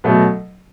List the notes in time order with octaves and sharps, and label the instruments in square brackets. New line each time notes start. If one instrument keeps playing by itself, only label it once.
[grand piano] B2 F#3 A3